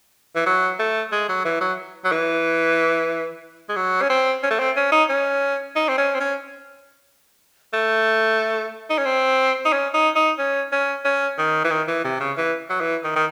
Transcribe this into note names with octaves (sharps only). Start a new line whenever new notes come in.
E3
F#3
A3
G#3
F#3
E3
F#3
F#3
E3
G#3
F#3
C#4
C4
C#4
A3
C4
C#4
D#4
C#4
D#4
C4
C#4
C4
C#4
A3
D#4
C#4
C4
D#4
C#4
D#4
D#4
C#4
C#4
C#4
D#3
E3
D#3
E3
C3
C#3
E3
F#3
E3
D#3
D#3